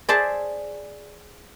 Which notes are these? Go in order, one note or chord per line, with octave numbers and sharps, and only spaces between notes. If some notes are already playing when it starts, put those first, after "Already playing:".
G#4 C5 D5 E5 A5